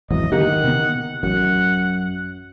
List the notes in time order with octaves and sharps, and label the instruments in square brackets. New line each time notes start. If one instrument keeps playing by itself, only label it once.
[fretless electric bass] G#1 E2 E3 [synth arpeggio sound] F#3 [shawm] D#5
[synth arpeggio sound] D3 A#3 G4 [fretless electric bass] D#3 [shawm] F#5
[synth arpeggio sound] C3 B3
[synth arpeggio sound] A1 [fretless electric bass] F#2 [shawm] F#5